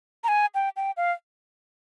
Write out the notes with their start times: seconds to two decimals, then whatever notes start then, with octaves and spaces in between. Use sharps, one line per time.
0.24 A#5
0.28 G#5
0.55 G5
0.76 G5
0.97 F5